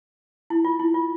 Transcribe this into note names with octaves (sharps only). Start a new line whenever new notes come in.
E4
F4
E4
F4